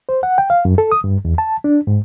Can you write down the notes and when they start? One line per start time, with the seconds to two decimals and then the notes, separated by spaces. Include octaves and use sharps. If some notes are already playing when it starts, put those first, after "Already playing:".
0.09 C5
0.23 F#5
0.38 G5
0.50 F5
0.65 F#2
0.78 A4
0.92 D#6
1.04 G2
1.25 E2
1.38 A5
1.64 D4
1.87 G#2